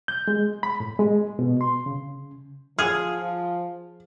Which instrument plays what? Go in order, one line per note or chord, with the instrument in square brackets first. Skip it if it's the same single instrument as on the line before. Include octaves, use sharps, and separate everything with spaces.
[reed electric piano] G6
G#3
B5
A2
G#3
B2
C6
C#3
[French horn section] F3 [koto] G#4 [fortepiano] F6